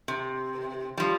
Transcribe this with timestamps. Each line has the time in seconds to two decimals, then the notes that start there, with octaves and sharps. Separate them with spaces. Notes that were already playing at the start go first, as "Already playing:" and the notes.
0.08 C3
0.98 F3 G3